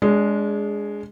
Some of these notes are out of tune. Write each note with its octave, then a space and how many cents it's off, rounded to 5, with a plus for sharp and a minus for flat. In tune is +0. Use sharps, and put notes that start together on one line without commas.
G#3 +0 D4 -30 G#4 +0